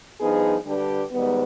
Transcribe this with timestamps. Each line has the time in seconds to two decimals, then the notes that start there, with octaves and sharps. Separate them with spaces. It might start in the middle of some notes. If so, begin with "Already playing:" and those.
0.19 G2 F3 B3 D#4 G#4
0.65 D3 G3 D4 G4 B4
1.11 G#2 D#3 G3 B3